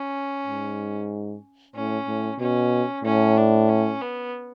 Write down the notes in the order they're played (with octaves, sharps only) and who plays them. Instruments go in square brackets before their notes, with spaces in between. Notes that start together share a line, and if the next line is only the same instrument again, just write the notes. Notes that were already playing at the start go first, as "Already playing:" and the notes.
Already playing: [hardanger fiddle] C#4
[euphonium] G#2
[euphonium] A2 [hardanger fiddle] C#4
[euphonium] A2
[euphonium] B2 [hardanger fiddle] C#4
[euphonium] A2 [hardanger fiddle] C#4
[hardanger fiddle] D4
C#4
B3